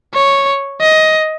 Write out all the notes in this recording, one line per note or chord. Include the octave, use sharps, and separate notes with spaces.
C#5
D#5